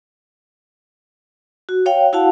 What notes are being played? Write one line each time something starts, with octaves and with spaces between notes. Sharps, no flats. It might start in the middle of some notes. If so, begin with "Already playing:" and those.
F#4
C#5 F5 G5
E4 F#4 F5 F#5 A5